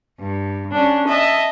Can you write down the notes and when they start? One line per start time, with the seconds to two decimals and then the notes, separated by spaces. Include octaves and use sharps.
0.20 G2
0.72 C#4 D4
1.08 D#5 E5 A5